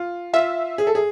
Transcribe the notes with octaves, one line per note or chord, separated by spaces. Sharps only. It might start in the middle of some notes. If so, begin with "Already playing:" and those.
Already playing: F4
F4 E5
G#4
A4
G#4